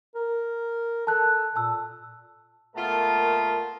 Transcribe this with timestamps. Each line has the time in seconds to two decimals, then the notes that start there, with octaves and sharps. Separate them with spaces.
0.15 A#4
1.07 A4 A5 F#6
1.56 A#2 A5 E6
2.76 A#2 A3 B3 F4 A#4 A5